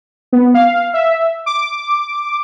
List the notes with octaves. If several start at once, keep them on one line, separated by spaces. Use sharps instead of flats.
B3
F5
E5
D6